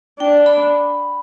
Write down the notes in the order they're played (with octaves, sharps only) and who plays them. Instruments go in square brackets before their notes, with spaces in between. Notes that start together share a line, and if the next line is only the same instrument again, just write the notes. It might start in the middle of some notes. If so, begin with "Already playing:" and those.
[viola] D4 [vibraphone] G5
[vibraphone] B5